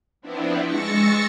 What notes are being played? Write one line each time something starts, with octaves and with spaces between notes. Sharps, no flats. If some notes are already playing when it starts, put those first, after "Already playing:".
F3 B3 C4 D4 E4
G#3 C#6 E6 A6 A#6 C#7